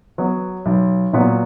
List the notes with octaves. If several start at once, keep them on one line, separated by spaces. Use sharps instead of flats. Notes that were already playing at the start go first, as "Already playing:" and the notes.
F#3 B3
B1
A#2 F#3 B3